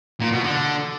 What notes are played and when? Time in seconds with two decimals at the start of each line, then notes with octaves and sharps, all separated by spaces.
0.21 A#2
0.32 B2
0.44 D3